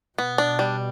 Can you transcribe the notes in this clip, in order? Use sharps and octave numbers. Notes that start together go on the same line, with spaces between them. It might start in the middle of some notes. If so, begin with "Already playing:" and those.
B2 B3
D4
G3